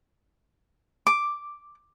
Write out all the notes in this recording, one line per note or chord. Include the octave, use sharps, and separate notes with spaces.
D6